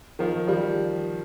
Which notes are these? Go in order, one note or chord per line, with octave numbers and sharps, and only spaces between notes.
D#3 F3
F3 G3